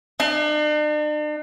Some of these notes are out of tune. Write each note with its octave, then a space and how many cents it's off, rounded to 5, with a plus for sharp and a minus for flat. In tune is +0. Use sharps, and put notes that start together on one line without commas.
D4 +45